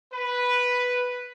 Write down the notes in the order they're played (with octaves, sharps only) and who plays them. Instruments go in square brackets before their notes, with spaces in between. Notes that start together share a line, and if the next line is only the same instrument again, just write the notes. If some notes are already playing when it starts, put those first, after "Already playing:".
[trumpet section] B4